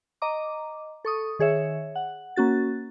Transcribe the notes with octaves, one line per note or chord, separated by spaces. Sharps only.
D#5 A#5 D6
A4 C#6 D#6
D#3 G#4 C#5 E5
F#5
A#3 C#4 F#4 A6